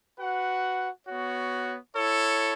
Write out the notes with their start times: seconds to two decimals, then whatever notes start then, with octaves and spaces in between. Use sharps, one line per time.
0.19 F#4 B4 F#5
1.06 B3 F#4 C#5
1.94 E4 A4 C#5